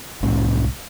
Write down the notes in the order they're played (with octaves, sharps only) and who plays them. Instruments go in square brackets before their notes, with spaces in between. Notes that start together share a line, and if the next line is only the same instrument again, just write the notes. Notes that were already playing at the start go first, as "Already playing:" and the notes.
[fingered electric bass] C2 A2 G#3 C#4